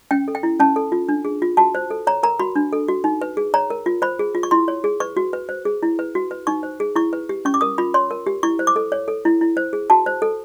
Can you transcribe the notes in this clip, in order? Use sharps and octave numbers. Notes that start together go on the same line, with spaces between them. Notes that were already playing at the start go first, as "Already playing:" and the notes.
C#4 G5
A4
G5
E4
C#4 A5
A4
F4
D4
G#4
F4
F#4 A5
C5
A4
C#5 A#5
A#4 A#5
F#4 B5
D4
A4
F#4
D#4
B4
G#4
C#5 A#5
A#4
F4
C5 B5
G#4
F4
C#6
E4 C6
C#5
G#4
B4 C#6
F#4
B4
C5
G#4
E4
B4
F#4
B4
D#4 C#6
C5
G#4
E4 C#6
B4
G4
C#4 C#6
D6
A#4 D#6
F4 B5
C#5 C6
A#4
G4
E4 C#6
C5
D6
A4
C#5
A4
E4
E4
C5
G#4
F#4 A5
C5
A4